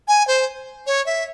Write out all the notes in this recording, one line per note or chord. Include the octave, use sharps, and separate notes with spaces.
G#5
C5
C#5
E5